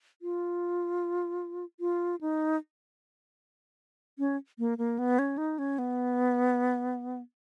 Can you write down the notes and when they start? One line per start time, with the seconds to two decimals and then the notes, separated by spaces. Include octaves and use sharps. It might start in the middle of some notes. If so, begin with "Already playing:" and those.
0.22 F4
1.80 F4
2.21 D#4
4.19 C#4
4.59 A#3
4.78 A#3
4.99 B3
5.19 C#4
5.38 D#4
5.59 C#4
5.79 B3